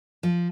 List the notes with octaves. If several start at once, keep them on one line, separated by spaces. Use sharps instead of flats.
F3